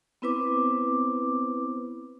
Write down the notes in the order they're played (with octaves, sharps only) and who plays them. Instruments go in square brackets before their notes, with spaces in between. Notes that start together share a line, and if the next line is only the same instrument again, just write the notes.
[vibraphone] B3 C4 E4 B4 C5 D6